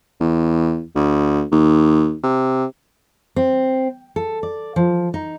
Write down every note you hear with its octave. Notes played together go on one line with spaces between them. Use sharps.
E2
D2
D#2
C3
C4
A4
D5
F3
D#4